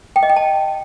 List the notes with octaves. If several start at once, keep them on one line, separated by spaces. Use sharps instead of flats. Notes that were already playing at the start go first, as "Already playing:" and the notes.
G5
D#5
G5
A5